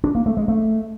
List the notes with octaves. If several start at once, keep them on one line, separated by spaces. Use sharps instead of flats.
D4
A#3
A3
G#3
A3